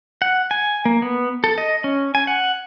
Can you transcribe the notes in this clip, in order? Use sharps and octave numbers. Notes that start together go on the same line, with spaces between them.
F#5
G#5
A#3
B3
A4
D#5
C#4
G#5
F#5